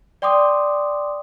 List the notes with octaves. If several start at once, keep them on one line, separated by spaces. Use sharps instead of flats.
D5 G5 C6 D6 D#6